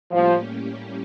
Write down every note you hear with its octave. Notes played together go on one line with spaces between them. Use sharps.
A2 F3 G3 A#3 C#4 G4